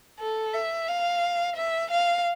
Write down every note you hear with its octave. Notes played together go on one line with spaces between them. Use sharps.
A4
E5
F5
E5
F5